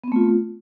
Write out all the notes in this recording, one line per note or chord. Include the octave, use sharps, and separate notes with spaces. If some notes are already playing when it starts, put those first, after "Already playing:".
A3 B3 C4 F4